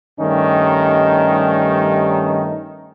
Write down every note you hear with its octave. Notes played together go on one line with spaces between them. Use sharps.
G2 D#3 G3 A3 C#4 D#4